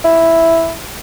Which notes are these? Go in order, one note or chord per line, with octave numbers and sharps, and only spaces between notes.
E4